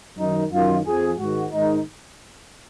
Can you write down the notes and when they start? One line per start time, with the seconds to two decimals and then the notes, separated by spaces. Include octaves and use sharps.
0.18 F#2 D#3 D#4
0.51 F#2 D#3 F4
0.85 F2 F3 G#4
1.18 G#2 D#3 F#4
1.52 G#2 D#3 D#4